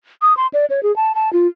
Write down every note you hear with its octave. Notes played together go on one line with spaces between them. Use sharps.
D#6
C6
D5
C#5
G#4
A5
A5
F4